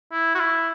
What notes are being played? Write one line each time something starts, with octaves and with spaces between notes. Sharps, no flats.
E4
F#4
E4